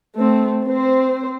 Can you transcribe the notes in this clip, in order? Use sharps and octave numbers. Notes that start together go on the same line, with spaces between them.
A3 C4
C4 C5